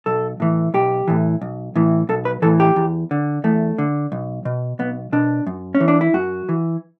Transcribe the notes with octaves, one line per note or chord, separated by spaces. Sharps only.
B1 A4
A2 E3
B1 G4
A2 E3
B1
A2 E3
B1 A4
B4
A2 E3 A4
G4
E2
D3
E2 A3
D3
B1
B2
B1 B3
B2 D4
F#2
C#4
E3
D4
E4
F#2 F#4
E3